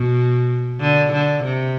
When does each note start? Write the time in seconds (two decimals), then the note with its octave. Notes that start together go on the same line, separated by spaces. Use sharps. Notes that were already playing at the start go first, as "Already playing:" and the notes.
Already playing: B2
0.81 D3
1.13 D3
1.44 C3